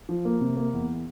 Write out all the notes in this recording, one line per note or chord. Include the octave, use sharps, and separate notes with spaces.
F3
A#3
C3
A#3
E2